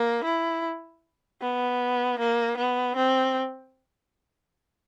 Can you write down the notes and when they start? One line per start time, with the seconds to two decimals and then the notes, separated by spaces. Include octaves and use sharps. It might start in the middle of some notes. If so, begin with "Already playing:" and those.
Already playing: A#3
0.25 E4
1.42 B3
2.19 A#3
2.57 B3
2.96 C4